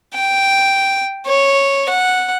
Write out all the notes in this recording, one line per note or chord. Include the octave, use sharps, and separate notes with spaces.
G5
C#5
F#5